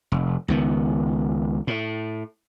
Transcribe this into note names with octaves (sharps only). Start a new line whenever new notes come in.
F1
C#2 D#3 B3
A2